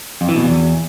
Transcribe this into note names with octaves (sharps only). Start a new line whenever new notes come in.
F2
E3
B2
E2